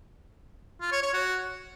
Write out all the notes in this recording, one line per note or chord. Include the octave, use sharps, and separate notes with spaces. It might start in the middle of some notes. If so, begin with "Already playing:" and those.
F4
C#5
C#5
F#4